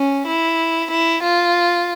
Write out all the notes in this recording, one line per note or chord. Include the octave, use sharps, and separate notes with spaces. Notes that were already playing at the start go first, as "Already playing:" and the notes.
Already playing: C#4
E4
E4
F4